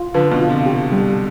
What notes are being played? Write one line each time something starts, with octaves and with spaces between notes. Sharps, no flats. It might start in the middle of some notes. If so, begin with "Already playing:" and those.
Already playing: F4
D3 F3 B4
B2 D3
F4
C3
G4
G3